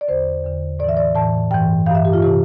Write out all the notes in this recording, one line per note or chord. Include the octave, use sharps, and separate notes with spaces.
D5
E2 D3 C5
E2 D3
A2 D5
E3 E5
D5
A2 E3 A5
G2 E3 G5
G2 E3 E5 F5
G4
F4
C3 E3 G4